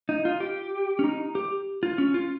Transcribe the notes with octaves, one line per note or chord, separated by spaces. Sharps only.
D#4
F4
G4
C#4
D#4
G4
F4
C#4
F4